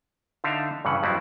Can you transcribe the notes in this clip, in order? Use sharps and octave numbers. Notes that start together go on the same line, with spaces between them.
D3 D4 D#4 E5 F5
G2 C#3 E3 F#5
F2 F#3 G3 B3 C4 E4